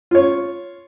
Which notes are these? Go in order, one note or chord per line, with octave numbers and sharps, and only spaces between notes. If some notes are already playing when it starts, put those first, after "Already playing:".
F4 C#5